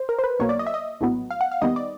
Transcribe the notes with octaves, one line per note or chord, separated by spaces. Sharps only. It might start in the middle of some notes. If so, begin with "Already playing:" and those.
Already playing: C5
A#4
C5
B4
B1 B2 F#3 A#3 C#5
D5
D#5
E5
D#5
A#1 A2 F#3 B3
F5
F#5
F5
D#2 D#3 G3 B3 D#5
D5